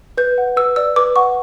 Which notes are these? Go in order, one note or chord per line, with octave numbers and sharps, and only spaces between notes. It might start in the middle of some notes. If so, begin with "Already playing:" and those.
B4 G6
F#5
B4 E6
D5 E6
B4 D6
F#5 C#6